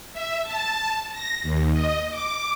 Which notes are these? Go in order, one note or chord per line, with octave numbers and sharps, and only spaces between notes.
E5
A5
A#6
D#2
D#5
D6